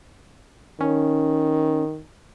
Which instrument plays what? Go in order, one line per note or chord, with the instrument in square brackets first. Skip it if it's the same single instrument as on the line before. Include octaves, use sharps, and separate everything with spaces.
[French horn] D#3 [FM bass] C#4